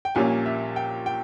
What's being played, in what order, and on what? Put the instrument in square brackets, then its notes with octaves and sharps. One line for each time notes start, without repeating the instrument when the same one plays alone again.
[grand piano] G5
[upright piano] A#1 A#2 G3 A#3 C#4 [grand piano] G#5
[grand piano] E5
G5
G5